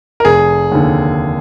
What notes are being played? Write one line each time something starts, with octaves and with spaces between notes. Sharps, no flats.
A#4
F1 G#4
D#2 D3